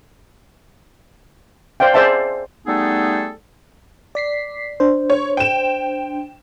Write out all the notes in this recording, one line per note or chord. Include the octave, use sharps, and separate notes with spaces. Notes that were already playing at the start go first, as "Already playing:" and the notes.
C5 D5 F5 G5
G#4 C5 D5 E5 A5
G3 A3 B3 D#4 G#4 A4
D5 B6 C7
D4 C5
C#5
G5 E7